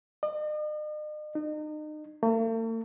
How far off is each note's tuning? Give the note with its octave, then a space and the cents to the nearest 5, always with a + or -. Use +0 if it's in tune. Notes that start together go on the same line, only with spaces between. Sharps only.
D#5 -45
D#4 -35
A3 +45